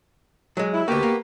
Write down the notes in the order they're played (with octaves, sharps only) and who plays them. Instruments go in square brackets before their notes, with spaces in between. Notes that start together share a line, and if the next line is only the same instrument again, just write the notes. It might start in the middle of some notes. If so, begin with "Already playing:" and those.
[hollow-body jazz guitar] F#3 G#3
[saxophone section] E4
[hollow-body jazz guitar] D2 A#3 [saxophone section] B3 F#4 G4
[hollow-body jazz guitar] A#3